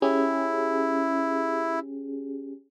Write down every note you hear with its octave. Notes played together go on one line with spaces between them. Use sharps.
C#4 E4 G4 G#4